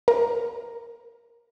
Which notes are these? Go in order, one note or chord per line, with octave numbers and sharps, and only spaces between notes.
A#4